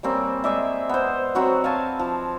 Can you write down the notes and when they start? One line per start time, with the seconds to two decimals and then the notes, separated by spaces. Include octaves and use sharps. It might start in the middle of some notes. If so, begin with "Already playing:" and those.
0.03 G3 A#3 C4 C#4
0.44 G#3 G#4 D5 E5
0.89 B3 C5
1.35 F#3 C4 F#4 B4
1.64 F5 G#5 A5
1.99 F3